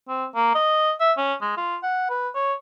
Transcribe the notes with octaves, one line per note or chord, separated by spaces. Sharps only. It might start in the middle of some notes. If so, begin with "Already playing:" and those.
C4
A#3
D#5
E5
C#4
G#3
F4
F#5
B4
C#5